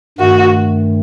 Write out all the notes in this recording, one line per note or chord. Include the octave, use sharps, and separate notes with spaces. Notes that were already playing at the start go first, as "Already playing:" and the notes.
G2 D#3 A3 F#4